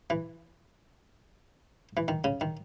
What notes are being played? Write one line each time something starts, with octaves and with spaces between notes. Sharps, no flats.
E3
E3
D#3
C#3
D#3